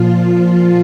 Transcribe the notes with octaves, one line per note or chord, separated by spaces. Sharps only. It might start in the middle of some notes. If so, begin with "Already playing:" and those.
Already playing: A#2 F3 F4